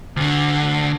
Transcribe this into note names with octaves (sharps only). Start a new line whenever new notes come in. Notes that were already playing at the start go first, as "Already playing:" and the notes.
D2 D3